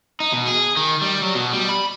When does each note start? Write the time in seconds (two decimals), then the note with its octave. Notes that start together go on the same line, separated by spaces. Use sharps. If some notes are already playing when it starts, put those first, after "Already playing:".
0.20 D#4
0.33 B2
0.47 G#4
0.77 D#3
1.02 G3
1.22 F#3
1.35 B2
1.53 G3
1.69 B5